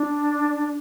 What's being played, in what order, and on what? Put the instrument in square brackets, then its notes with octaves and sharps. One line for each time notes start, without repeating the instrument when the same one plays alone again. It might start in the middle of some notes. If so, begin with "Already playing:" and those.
Already playing: [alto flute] D4